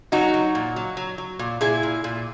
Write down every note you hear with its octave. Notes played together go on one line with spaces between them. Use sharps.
F#3 D#4 F#4
F#3
A#2
F#3
F#3
F#3
A#2
A#2 E4 G#4
A#2
A#2